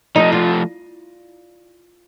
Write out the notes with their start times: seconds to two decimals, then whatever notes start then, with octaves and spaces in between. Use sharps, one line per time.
0.16 F3 A3 D#4
0.32 F4